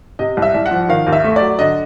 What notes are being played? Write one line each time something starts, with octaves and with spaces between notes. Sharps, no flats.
C3 D#5
C2
E5
C2
F#5
F3
D#3 F5
D#2
E5
A3
D5
F#3
D3 D#5